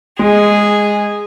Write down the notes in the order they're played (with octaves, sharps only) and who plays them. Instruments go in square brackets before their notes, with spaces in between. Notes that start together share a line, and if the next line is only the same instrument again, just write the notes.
[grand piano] G#3 [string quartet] G#4